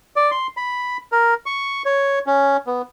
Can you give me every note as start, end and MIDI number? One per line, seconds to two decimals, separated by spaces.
0.16 0.31 74
0.31 0.47 84
0.57 0.97 83
1.12 1.34 70
1.46 1.82 85
1.85 2.19 73
2.27 2.57 61
2.67 2.82 59